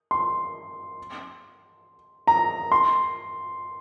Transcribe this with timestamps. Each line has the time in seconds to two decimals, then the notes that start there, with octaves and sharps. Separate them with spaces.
0.11 C6
2.27 A#5
2.72 C6